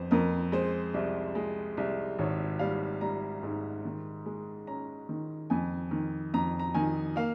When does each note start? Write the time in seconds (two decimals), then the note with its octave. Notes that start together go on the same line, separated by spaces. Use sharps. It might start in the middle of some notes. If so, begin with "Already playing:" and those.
Already playing: G1 F2 C5
0.11 F2 A#4
0.52 G#3 C5
0.94 C2
1.35 G#3
1.77 C2
2.19 G#1 C#5
2.59 G3 F5
3.01 G3 A#5
3.43 G#2
3.85 D#3
4.26 G#3
4.67 C#4 A#5
5.09 D#3
5.50 F2 G#5
5.91 D#3
6.34 F2 A#5
6.59 A#5
6.74 D#3 G#5
7.16 A#3 F5